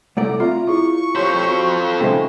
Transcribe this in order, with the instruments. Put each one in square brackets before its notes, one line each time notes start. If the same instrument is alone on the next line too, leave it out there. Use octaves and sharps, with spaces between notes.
[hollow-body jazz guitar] C2 A3 D5 [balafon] F#5 [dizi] A#5
[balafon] C4 E5 [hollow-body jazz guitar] F4 [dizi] A#5
[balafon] E4 G#4 [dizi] C#6
[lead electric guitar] F2 C5 [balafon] G4 C#5
[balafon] F#4
[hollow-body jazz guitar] C#3 G#3 C4 [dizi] D#4 [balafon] A4 E5 C#6